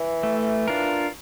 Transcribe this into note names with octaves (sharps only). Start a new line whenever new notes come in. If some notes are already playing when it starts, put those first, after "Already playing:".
Already playing: E3
A3
D4 F4 A#4